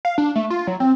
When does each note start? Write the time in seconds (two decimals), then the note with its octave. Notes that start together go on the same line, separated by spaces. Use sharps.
0.05 F5
0.18 D4
0.36 A3
0.50 F4
0.67 F#3
0.80 C4